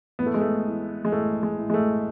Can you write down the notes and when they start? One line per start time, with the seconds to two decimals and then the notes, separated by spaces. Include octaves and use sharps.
0.19 A1 B3
0.26 A3
0.34 G#3
0.41 A3
0.66 E3
1.05 G#3
1.12 A1 A3
1.43 G#3
1.58 A2
1.70 G#3
1.74 A3